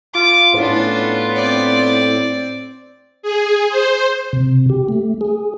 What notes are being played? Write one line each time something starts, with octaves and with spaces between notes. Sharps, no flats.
F4 D6
A2 B3 C#4 D4 F4
C4 D5
G#4
C5
C3
G4
A3
G#4